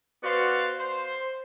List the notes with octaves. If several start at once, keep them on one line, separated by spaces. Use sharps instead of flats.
B3 F#4 C5 D5 F5
C5